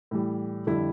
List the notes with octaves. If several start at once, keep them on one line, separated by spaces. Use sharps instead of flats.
A2 E3 G3
F2 D3 G3 E4